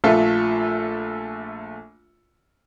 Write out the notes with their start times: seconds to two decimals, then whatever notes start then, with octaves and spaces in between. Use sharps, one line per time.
0.04 A#1 A3 F4 A4 E5